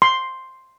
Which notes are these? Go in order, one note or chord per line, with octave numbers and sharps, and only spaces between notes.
C6